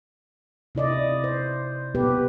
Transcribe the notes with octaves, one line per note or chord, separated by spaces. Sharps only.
C3 E4 D5 D#5
C5
B2 B3 G4 B4